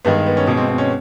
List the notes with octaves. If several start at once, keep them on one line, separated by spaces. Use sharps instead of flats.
G2 D#3 G#3 B3
B3
C#4
B2 G#3 C#4
C4
C4
C#4